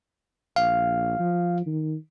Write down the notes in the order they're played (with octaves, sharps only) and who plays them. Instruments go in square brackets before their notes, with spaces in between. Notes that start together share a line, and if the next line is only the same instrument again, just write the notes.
[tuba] A#1 [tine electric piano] F5
[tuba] F3
D#3